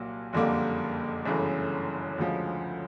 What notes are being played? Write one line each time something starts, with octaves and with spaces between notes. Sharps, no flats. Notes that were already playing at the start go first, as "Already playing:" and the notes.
Already playing: C2 A#2 F#3 A#3
F#1 F2 D3 G3 A#3
G1 F#2 C#3 E3 A3
D2 C#3 F3 G#3